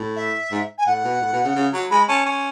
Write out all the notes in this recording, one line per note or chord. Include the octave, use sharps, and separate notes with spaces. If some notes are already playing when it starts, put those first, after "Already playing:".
Already playing: A2
E5
G#2
G#5
A2 F#5
B2
A2
B2
C#3
C#3
F#3
G#3 B5
C#4 A5
C#4